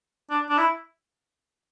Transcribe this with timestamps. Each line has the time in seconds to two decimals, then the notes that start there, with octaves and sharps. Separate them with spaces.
0.30 D4
0.49 D4
0.58 E4